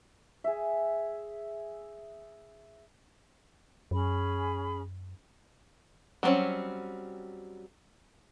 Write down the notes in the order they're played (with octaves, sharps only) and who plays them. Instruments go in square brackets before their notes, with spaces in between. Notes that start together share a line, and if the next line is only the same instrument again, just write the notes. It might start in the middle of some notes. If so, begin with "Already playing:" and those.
[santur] G#4 E5
[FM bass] F#2 [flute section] C#4 G#4 B5
[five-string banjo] F#3 G3 A#3 C4 C#4